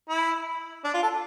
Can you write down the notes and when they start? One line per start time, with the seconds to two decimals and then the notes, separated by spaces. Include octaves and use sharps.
0.09 E4
0.84 D4
0.94 F4
1.03 A4